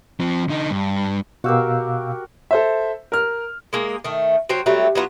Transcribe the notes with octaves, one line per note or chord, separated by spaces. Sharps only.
F3 C4
D3 D#4
G2
B2 F#4 G4 A#4 F5 E6
A4 C5 E5
A#4 F6
G#3 A#3 G#4
D#3 A3
F#3 C5 G5
F#3 G3 A3 C4
F#3 B3 D#4 F4